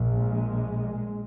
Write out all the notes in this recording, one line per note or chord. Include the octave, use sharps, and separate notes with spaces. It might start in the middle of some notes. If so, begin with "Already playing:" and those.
Already playing: A#1 A#2
G#3